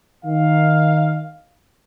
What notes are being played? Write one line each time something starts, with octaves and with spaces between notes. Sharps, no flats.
D#3 F5